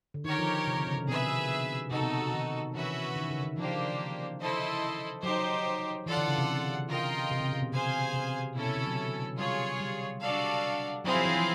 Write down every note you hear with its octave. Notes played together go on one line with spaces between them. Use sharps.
D3
D#3 G4 A#4 C#5
F3
C3
D3
C#3
C3
B2 G#4 B4 E5
C3 D#4 F#4 A4
B2
C3
D#3
E3 C#4 F#4 B4 E5
D#3
C#3
D#3
F3 A#3 D4 G4 C5
E4 A4 C5 D#5
F#3 D#4 G4 C5
E3 F4 A4 D5 F#5
D3
C#3
C3
F4 A#4 D#5 G5
C3
C#3
C3
B2
C3 G#4 C5 F5 G#5
C3
B2 C#4 E4 A4
C3
D3
F#3
G3 F4 G#4 C#5
G3
D4 F#4 A4 D5 F5
F#3 C4 E4 G#4 C5 F5
F3
E3
F3